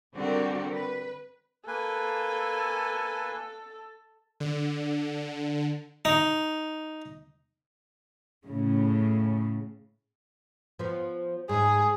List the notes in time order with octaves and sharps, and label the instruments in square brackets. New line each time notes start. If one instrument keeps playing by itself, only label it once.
[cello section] D3 G3 C4 F#4 G4 A#4
B4
[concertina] A#3 B4 G#5 [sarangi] A4
[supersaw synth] D3
[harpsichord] D#4
[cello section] A2 C#3
[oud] F3 B3
[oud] G#2 [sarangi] G#4